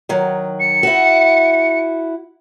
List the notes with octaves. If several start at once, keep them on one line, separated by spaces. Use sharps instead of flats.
D#3 F#3
C#7
E4 F#4